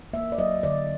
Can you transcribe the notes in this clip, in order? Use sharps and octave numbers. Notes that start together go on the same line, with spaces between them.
A#3 E5
D5
F#3 D#5
D3 D5